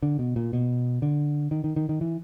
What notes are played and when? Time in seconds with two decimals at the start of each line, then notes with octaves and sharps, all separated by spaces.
0.03 D3
0.19 B2
0.36 A#2
0.53 B2
1.02 D3
1.51 D#3
1.64 D#3
1.76 D#3
1.89 D#3
2.01 E3